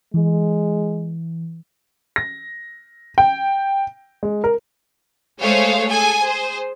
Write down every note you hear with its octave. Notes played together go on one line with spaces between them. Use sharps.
E3 G#3
A#6
G5
G#3
A#4
G#3 A3 G#4 C5 C#5 F5
G#4 A4 G#5
G#4 C5